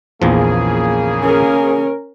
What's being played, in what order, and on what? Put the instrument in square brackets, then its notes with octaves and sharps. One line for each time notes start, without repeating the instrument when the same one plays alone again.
[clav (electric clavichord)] A#1 E2 F3 [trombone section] C#3 A#3 G#4
[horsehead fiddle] C#4 A#4